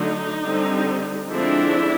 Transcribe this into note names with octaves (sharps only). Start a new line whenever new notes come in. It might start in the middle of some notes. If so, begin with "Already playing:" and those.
Already playing: D3 F#3 A3 D#4
D3 G3 C4
D3 F3 G#3 C4 D4 E4